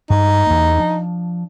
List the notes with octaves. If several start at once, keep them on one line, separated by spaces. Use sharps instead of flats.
G2 D#4
E2 A#3
F3 D4